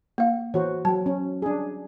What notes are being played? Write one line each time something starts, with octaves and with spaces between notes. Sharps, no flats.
A#3 F5
E3 F#4 C5 C#5
F#3 G5 A5
C#4
D4 G#4